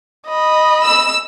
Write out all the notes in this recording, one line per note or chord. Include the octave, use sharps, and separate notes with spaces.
D#5 B5
E6